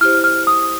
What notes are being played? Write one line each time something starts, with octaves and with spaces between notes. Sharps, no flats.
E4 G4 C5 F6
F6
D#6